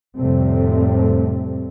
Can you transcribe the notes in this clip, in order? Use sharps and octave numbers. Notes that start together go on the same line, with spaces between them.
F1 A2 C3 G3 A3 C4